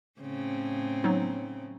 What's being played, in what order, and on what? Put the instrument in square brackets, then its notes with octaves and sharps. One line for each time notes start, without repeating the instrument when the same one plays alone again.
[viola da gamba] A2 C#3 C4
[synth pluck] F#3 B3 D#4